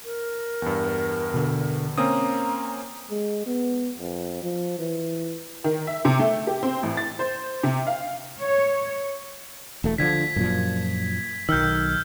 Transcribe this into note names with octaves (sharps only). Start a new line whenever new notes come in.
A#4
E2 G2
B2 D3
A#3 C4 C#4 A#5 D#6
G#3
B3
F2
F3
E3
D#3
E5
C3
A3
G4
C4
A1
A6
C5
C3
F5
C#5
E1 A3
D3 D#3 F3 G#6 B6
F#2 A#2 F3
B1 D#3 E6 F6 G6